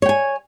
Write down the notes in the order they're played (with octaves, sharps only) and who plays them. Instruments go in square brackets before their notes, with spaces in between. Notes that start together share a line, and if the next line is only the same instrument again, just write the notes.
[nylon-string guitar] C#5
G5
G#5